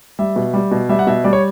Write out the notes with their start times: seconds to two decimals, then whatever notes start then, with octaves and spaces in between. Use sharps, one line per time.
0.19 G3 E5
0.36 B2
0.54 G3
0.71 B2
0.89 G3 E5
0.99 F#5
1.07 B2 E5
1.24 G3 D5
1.33 C#5